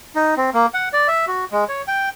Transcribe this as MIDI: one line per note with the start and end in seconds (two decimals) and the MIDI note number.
0.15 0.35 63
0.37 0.50 60
0.54 0.66 58
0.74 0.89 78
0.93 1.07 74
1.08 1.25 76
1.27 1.45 66
1.52 1.64 56
1.68 1.82 73
1.88 2.09 79